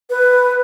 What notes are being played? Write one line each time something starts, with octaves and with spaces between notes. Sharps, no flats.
B4